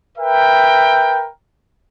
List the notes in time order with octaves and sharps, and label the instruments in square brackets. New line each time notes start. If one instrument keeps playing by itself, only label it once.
[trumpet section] A#4 B4 E5 G5